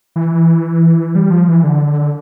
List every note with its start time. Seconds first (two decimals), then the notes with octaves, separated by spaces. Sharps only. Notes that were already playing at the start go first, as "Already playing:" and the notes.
0.16 E3
1.15 G3
1.31 F3
1.48 E3
1.64 D3